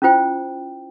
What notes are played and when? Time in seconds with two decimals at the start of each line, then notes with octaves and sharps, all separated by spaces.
0.02 C#4 E4 F4 C5 G5